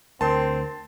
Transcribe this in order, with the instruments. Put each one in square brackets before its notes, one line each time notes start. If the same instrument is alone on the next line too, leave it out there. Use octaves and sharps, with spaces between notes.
[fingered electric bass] D2 [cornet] C4 [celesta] A#4 [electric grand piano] A5 C6